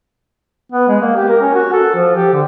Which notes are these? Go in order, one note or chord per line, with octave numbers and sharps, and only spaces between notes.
B3
G#3
A#3
G4
A#4
C#4
F#4
A4
F3
G4
D3